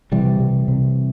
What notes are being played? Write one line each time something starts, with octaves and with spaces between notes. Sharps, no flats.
C3 E3 G3
C3
C3